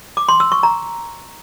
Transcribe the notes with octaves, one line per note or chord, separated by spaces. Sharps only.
D6
C6
E6
C#6
A#5